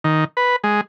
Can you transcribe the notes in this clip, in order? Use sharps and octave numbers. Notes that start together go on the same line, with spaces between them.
D#3
B4
G#3